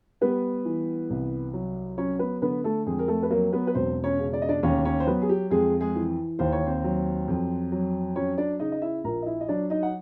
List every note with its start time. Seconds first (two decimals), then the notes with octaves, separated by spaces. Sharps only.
0.21 G3 B3 B4
0.65 E3
1.10 C2
1.53 F#3
1.97 F#3 C#4 C#5
2.19 B3 B4
2.42 D3 B3 B4
2.64 A3 A4
2.86 F2 G#3 G#4
2.99 A#4
3.08 A3 A4
3.23 B4
3.31 F#3 A#3 A#4
3.52 B3 B4
3.67 B4
3.75 E1 C4 C5
4.04 C#4 C#5
4.19 C#3
4.33 D5
4.42 D#5
4.49 D4 D5
4.63 D#2 C#4 C#5
4.85 C#4 C#5
5.00 C5
5.06 F#3 B3 B4
5.22 G#4
5.29 G4
5.51 F2 G#3 G#4
5.81 G#3 G#4
5.96 E3
6.39 D#2 C5
6.52 C#5
6.66 C4 C5
6.84 F#3
7.28 F2
7.72 F#3
8.16 F#3 C#4 C#5
8.38 D4 D5
8.60 C#3 D#4 D#5
8.72 D#5
8.82 E4 E5
9.04 A#1 A#4 A#5
9.22 D#5
9.26 E4 E5
9.41 D#5
9.49 F#3 D4 D5
9.70 D#4 D#5
9.83 F#5